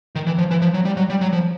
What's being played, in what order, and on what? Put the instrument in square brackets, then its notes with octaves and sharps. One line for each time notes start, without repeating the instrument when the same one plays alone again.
[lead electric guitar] D#3
E3
F3
E3
F3
F#3
G3
F#3
G3
F#3
F3